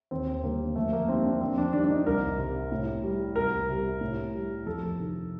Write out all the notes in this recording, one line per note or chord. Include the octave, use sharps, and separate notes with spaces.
D#2 C4
D3 G3 A#3
F2 A3
A#3
D#3 G3 C4
D4
F2 C4
D4
D#3 G3 D4
D4
D#4
C2 A#4
C3 G3
A2
G3
C2 A#4
C3 G3
A2
G3
F2 A4
C3 D#3